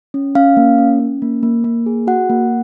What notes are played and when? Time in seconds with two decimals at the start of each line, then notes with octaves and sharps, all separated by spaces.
0.14 C#4
0.35 C#4 F5
0.57 A#3
0.78 C#4
1.00 C#4
1.22 A#3
1.43 A#3
1.64 A#3
1.86 G#4
2.07 F#4 F#5
2.30 A#3